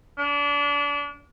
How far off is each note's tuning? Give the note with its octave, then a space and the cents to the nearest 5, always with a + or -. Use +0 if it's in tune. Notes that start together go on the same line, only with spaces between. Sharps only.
D4 -30